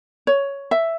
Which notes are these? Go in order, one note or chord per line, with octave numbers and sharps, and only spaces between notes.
C#5
E5